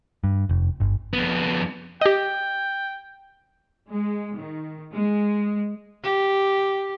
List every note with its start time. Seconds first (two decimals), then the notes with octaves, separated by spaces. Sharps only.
0.24 G2
0.49 F1
0.80 G1
1.13 F2 B3
2.01 G4 D#5 G5
3.89 G#3
4.37 D#3
4.94 G#3
6.03 G4